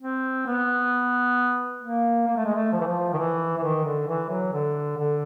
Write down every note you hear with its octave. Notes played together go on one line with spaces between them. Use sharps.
C4
B3
A#3
A#3
A3
G#3
A3
F3
E3
F3
D#3
E3
E3
D#3
D3
E3
F#3
D3
D3